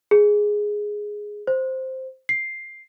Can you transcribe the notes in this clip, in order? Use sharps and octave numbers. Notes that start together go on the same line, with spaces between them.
G#4
C5
C7